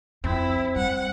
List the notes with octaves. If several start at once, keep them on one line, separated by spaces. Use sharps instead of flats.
F2 C4 E4
G3 F#5